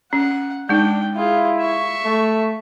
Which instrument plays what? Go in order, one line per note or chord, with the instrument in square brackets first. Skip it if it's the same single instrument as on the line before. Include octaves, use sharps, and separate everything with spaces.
[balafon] C#4 [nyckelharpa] F#5
[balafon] G#3 D#4 [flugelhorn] D4 [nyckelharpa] G5
[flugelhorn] E4 [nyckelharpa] F4 G#4
[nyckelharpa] E5 C#6
[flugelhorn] A3